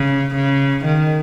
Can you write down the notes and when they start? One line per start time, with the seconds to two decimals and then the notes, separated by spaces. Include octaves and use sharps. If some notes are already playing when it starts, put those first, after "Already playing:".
Already playing: C#3
0.35 C#3
0.85 D#3